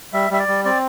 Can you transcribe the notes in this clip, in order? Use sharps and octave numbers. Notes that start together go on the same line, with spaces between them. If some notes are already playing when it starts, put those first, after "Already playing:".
G3 E5
G3 E5
D5
G3
C4 D5